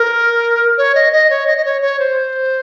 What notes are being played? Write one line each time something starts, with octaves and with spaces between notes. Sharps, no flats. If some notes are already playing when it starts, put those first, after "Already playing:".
Already playing: A#4
C#5
D#5
D#5
C#5
D#5
D#5
C#5
C#5
C5